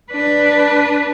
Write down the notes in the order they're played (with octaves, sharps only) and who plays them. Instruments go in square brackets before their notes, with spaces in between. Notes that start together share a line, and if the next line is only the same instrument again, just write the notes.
[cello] D4 B4